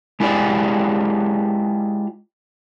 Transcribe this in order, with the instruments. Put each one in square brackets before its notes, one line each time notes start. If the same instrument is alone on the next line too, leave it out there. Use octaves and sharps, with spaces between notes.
[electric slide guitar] G#3 E4 F4 G4 G#4 D5